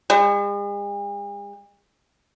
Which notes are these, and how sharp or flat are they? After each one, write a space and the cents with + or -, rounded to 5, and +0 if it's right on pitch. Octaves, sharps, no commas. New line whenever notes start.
G#3 -45